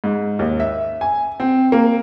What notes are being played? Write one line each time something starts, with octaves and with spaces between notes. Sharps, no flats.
G#2
D#2
E5
G#5
C4
A#3